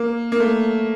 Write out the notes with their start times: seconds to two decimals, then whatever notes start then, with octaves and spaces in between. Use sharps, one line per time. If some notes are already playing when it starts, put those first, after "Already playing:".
Already playing: A#3
0.32 A#3
0.40 A3